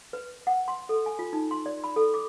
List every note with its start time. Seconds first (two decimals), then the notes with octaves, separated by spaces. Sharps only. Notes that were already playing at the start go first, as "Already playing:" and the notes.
0.13 B4
0.47 F#5
0.68 C6
0.89 A4
1.06 G#5
1.19 F4
1.33 D#4
1.51 C6
1.66 D5
1.84 B5
1.96 A4
2.14 D6